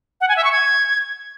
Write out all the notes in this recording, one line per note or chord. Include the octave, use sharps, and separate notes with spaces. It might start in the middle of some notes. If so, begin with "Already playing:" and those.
F#5
G#5
E5
C#6
G#6